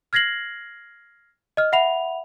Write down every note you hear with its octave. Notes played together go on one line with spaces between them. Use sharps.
F6 G#6 A#6 C7 F#7
D#5 F6
E5 F#5 B5 F7